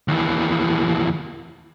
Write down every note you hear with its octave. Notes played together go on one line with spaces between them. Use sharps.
D#2 E3